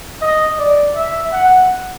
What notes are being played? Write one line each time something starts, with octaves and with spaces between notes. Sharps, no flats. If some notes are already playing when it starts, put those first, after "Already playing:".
D#5
D5
E5
F#5